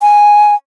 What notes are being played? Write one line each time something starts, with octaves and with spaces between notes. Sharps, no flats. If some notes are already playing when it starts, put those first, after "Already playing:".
G#5